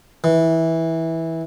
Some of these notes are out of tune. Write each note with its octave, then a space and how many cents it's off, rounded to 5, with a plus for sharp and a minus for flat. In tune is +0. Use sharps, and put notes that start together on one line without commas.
E3 -15